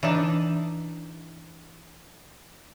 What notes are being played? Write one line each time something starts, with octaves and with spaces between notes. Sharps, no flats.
E3 D4 D#4 A5